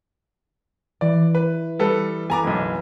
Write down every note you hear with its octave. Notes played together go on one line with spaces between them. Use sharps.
E3 D5
B4
G3 A4 B4
B3 A4 G#5 A#5 D6
F#1 B1 G#5